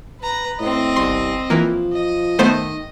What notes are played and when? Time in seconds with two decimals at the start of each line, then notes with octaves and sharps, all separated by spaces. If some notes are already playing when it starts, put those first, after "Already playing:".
0.21 B4 A#5
0.60 A2 C4 D#5
0.96 G1 C2 C6
1.50 E3 F3 A#3
1.93 D#5
2.39 D#3 A3 B3 C5